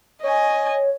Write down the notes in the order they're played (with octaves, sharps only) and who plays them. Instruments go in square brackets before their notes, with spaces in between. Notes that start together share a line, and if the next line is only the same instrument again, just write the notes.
[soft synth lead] C#5 [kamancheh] D#5 G#5